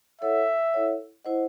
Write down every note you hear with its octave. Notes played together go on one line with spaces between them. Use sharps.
E4 A4 C#5 E5 F#5
E4 A4 C#5 F#5
E4 C5 D#5 F#5